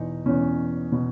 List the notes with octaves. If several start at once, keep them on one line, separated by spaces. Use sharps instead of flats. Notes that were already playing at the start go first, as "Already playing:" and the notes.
Already playing: E2 B2 D#4
E2 B2 C#4
B2